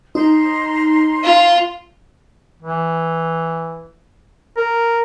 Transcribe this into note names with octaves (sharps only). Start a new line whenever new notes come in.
D#4 A#5 C6
F4
E3
A#4